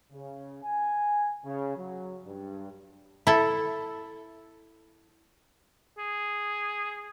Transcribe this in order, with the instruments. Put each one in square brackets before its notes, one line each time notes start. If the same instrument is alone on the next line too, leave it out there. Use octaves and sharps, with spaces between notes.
[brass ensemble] C#3
G#5
C#3
F#3
G2
[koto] E4 A4
[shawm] G#4